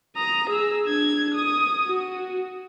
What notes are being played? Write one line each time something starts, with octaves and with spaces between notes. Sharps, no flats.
A#5 D#6
G#4 E6
D4 G#6
D#6
F#4